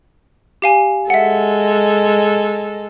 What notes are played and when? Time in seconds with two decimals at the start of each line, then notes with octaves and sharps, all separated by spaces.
0.62 G4 F5 G#5
1.10 G#3 A4 E5 F#5